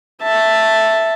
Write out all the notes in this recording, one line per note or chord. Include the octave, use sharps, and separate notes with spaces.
E5 A5